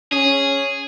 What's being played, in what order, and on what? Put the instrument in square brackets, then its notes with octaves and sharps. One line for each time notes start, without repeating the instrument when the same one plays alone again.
[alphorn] C#4 [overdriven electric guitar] G#4